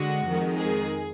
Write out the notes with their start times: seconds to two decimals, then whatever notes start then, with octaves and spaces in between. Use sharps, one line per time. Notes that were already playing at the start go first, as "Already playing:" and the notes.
Already playing: D3 G#3 F#4
0.25 F2 D#3 G#3
0.58 G#4